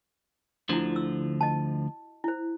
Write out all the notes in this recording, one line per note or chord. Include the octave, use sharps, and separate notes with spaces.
D2 D3 F3 E4 F#4
E6
D#5 A5
E4 C5